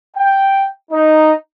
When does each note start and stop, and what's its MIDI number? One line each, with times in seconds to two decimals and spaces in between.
0.17 0.68 79
0.92 1.31 63